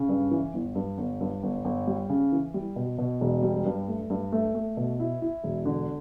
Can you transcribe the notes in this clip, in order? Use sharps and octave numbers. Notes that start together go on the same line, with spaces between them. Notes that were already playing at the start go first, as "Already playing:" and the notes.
Already playing: C#3
G2
E3
G1
G2
G1
G2
G1
G1
G3
C#3
E3
G3
B2
B2
E1
G3
G2
A3
G2
A3
A3
B2
E4
E4
E1
D3